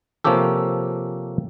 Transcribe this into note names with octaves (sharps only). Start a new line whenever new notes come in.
C3 F3 A#3 C#4 G4 A4